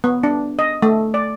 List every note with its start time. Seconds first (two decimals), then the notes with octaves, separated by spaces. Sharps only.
0.04 B3
0.23 D4
0.59 D#5
0.82 A3
1.14 D5